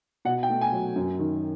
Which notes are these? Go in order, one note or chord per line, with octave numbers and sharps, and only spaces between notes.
B2 F#5
G5
A3
G#5
F#3
F#2
D#3